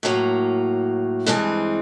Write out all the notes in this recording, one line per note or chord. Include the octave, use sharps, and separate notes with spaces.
A2 F#3 A#3
G2 E3 G#3 C4